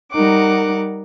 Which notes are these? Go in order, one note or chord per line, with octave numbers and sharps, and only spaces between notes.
G3 D#4 A#4 F#5 D6